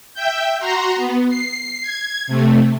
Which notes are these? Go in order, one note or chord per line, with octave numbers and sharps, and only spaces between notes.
E5 G5 G6
F#4 A#5 C6
B3
C7
G#6
C3 A3